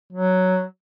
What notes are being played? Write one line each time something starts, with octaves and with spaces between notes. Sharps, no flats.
F#3